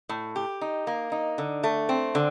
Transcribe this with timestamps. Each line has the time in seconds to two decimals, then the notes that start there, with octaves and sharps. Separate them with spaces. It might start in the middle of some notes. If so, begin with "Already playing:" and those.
0.09 A2
0.36 G4
0.61 D#4
0.87 A#3
1.12 D#4
1.38 D3
1.64 A3
1.89 C4
2.15 D3